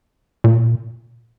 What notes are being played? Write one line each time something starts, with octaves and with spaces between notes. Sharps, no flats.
A#2